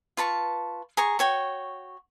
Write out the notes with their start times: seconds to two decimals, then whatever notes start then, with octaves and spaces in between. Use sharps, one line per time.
0.17 F4 B4 A5 C#6
0.97 G#4 A#5 C#6
1.19 F#4 C#5 G5